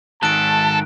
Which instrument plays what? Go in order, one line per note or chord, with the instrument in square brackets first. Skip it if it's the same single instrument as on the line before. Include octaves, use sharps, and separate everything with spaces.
[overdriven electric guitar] G#2 D#3 [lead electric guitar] A4 [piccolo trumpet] A5 [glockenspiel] F#6 D7